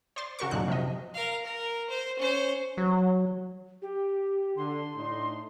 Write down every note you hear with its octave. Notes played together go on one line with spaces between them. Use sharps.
C5 D5 C6 A6
C#3 F#4 A#4 C#6
F#2 A#2 D3 D#4 F#6
C3 F3 D#5
A#4 F5
A#4
C5
C#4 C5
F#3
G4
D3 C6
A2 D4 D#4